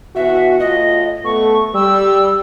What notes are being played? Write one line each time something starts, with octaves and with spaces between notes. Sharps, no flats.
B2 E3 F#4 E5
A2 F4 D#5
A3 B3 A4 C#6
G3 E6